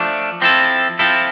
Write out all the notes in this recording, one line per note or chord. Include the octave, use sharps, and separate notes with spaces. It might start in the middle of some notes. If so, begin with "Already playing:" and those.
Already playing: F3 A3 D4
F3 C4 E4 A4
F3 C4 E4 A4